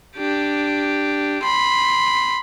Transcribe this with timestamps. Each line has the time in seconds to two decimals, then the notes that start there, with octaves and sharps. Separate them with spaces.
0.17 D4 G4
1.43 B5 C6